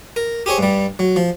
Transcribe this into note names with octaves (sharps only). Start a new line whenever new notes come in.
A#4
G4 G#4 C5 C#5
G2 G3
F#3
F3